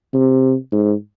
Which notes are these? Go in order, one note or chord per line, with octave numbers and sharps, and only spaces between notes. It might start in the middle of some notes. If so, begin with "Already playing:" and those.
C3
G#2